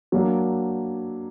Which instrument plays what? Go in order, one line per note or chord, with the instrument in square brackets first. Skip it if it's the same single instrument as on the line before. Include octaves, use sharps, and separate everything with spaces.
[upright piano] F#3 A#3 D4